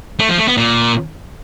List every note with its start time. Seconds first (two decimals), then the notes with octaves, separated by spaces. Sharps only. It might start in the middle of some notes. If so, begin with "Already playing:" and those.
0.19 A3
0.29 F3
0.38 A3
0.48 B3
0.57 A#2